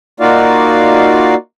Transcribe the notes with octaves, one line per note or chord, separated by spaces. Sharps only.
A#3 D#4 F4 F#4 D5 F5